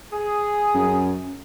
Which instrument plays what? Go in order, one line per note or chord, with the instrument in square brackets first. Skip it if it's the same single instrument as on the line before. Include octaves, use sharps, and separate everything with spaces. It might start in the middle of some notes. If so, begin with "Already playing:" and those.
[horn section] G#4
[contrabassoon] F#2